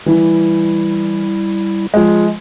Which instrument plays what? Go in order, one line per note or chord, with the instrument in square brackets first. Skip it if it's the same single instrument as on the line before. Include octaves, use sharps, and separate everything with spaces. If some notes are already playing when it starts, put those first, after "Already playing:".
[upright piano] E3 [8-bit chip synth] G3 E4
[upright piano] F3 G#3